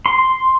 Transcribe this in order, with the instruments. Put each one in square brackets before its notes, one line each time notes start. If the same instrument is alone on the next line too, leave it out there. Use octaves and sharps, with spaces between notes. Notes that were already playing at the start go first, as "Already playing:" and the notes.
[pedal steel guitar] C6